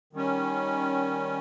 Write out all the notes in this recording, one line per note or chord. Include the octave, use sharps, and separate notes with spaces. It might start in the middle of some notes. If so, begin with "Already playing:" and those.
D#3 G3 C#4